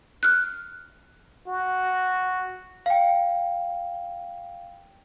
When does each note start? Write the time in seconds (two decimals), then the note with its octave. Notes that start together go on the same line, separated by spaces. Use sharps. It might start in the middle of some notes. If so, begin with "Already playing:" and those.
0.23 F6 F#6
1.48 F#4
2.86 F5 G5